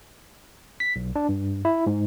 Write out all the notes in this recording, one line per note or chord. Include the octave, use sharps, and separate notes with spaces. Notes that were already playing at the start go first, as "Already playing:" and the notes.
B6
B1
D4
G2
E4
G#2